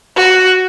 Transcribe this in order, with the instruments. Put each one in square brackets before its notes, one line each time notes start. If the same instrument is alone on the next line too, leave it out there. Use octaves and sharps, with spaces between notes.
[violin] F#4